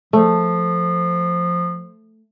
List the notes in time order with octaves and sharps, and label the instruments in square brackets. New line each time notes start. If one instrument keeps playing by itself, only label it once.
[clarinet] F3 [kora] A3